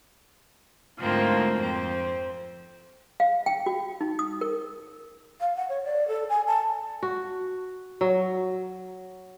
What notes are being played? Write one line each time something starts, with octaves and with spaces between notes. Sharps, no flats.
D2 G#2 F3 A#3 C4
F2 C4
F5
G5
F#4
D#4
D#6
A#4
F5
F#5
C#5
D5
A4
G#5
A5
F#4
F#3